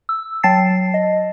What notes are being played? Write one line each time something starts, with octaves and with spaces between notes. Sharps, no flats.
E6
F#3 G5 A5 A6 C7
D#5